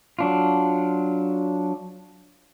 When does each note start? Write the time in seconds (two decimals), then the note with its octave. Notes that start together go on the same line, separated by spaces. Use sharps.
0.19 F#3 D4 F4